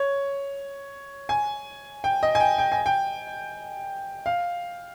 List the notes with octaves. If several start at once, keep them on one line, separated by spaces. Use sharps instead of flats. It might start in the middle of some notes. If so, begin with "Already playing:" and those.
Already playing: C#5
G#5
G5
D#5
G#5
G5
G5
G#5
G5
F5